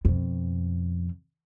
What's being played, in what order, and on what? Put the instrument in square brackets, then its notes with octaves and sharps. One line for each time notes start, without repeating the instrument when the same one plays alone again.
[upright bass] F2 B2